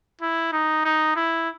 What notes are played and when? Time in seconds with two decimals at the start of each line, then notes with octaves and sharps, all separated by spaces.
0.21 E4
0.52 D#4
0.85 D#4
1.16 E4